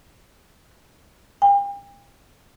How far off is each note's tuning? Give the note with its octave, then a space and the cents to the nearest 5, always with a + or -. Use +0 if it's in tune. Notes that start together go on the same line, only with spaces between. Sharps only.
G5 +40